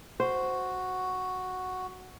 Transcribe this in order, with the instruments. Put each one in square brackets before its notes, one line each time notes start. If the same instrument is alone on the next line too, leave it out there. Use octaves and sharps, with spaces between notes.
[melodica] F#4 [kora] C5